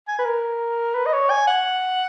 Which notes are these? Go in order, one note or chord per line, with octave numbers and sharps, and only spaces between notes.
G#5
B4
A#4
B4
D#5
C#5
G#5
F#5